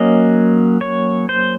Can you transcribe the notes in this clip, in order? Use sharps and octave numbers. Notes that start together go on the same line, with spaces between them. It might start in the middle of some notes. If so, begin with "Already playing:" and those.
Already playing: F#3 A#3 C#4 D#5
C#5
C5